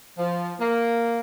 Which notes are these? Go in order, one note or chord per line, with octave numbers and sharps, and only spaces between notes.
F3
A#3